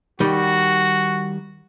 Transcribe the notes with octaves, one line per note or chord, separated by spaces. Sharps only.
D#3 G3 F#4